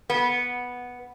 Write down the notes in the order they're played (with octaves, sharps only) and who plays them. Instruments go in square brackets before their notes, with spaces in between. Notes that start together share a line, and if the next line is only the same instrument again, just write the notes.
[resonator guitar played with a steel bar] B3